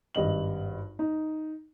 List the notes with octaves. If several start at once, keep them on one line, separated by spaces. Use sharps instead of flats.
G#1 G2 D#5 F#7
D#4